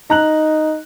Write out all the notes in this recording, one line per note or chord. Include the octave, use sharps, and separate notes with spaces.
D#4 A#5 F#6 F#7